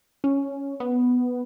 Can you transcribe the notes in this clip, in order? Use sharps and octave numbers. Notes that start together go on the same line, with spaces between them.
C#4
B3